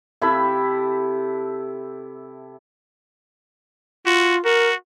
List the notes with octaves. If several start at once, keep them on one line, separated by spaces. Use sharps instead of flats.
C3 E4 A4 B5
F4 F#4
F#4 A#4